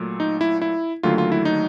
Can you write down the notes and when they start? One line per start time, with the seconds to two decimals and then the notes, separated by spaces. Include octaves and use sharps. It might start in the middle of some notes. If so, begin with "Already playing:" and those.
Already playing: A#2 F#3 A3
0.20 D#4
0.41 E4
0.62 E4
1.03 D#2 D3 F#3 A3 F4
1.18 F4
1.32 E4
1.45 D#4